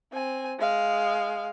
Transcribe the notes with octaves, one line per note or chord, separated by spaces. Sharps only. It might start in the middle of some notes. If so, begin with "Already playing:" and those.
C4 G#5
G#3 F5